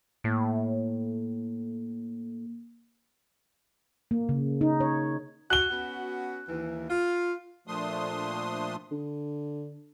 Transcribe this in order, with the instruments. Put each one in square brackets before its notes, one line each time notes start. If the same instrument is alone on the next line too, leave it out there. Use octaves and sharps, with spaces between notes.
[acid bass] A2 [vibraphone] A#3
[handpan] A#3
C#3
D#4
C#5
[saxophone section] F#4 [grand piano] F#6 G7
[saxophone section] B3 C#4 F#4
D#2 E3
F4
[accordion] A#2 F3 A3 D4 C6 D#6
[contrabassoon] D3